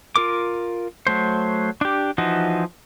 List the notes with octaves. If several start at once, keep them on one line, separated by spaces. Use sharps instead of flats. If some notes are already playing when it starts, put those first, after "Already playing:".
F4 A#4 D6
F#3 A3 C5
D4 G4
E3 F3 D#4 F#4